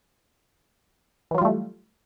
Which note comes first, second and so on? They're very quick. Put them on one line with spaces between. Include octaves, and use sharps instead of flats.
E3 F#3 F4 G3 A3